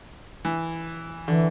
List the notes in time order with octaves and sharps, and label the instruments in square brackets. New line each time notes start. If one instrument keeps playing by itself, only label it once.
[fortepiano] E3
[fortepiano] D3 [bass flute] E3